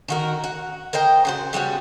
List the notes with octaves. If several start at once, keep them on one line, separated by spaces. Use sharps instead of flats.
D#3 F#4 A#4
F#4
A#4 C5 D#5 G5
C#3 F#4 C5
C#3 G3 B3 F#4